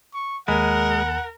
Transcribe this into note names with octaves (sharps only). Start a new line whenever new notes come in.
C#6
D#2 G#3 A#4 F#5 G#5 B5